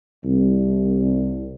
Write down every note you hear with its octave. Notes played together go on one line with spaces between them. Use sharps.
C2